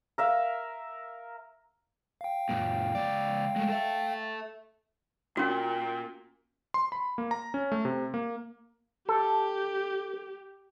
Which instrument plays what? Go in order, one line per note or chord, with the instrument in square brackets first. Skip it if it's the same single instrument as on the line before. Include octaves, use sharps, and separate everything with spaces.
[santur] A#4 E5 F5
[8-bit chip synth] F5 G5
[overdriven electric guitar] F#2 A#2
C#2 D5
G#3 A3
A4 E5
[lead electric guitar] A#2 [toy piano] C#4 F#4 [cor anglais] G5
[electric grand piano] C6
B5
A#3
A#5
C#4
A3
C3
A#3
[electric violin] G4 [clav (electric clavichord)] A4